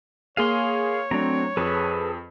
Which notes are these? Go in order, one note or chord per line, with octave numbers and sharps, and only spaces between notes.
A#3 G#4 C#5 F5 C6 D#7
F#3 A3 C4 D4 A#5
F2 G#4 A4 B4